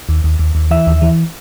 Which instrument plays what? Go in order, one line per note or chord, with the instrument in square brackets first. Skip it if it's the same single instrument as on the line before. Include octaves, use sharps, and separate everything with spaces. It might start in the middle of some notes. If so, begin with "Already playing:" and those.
[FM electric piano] D#2
D#2
D#2
D#2
E3 E5
D#2
E3